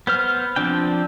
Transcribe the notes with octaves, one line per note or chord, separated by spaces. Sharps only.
B3 C5 F6
F3 C4 D4 G5